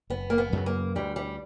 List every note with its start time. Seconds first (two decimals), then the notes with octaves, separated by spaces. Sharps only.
0.10 F#1 B3
0.30 A#3
0.38 B3
0.52 F#2 C#3 F#3
0.66 A#3
0.95 D2 G3
1.16 G3